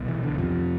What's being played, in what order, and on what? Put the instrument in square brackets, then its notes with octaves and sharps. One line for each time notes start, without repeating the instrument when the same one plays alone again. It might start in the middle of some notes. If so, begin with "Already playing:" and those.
Already playing: [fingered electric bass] C2 B2
E3
D3
F2 C3 F3